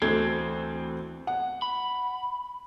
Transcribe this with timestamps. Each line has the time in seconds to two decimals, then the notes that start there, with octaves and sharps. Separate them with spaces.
0.02 D2 E3 C4 A4 G#6
1.27 F#5
1.62 B5